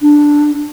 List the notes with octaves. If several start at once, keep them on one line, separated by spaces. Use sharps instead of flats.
D4